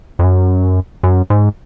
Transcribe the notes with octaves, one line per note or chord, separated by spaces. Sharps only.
F2
F#2
F#2
G#2